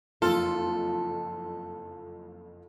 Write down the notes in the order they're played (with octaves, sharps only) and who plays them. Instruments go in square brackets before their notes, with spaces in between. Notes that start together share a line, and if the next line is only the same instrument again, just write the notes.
[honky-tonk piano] F#1 F2 C6 [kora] F4 [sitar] A4